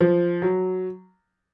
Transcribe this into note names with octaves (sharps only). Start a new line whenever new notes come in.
F3
F#3